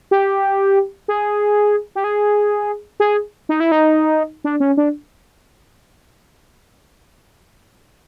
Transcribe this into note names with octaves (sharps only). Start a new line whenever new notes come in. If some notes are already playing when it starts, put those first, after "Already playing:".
G4
G#4
G4
G#4
G#4
D#4
E4
D#4
D4
C#4
D4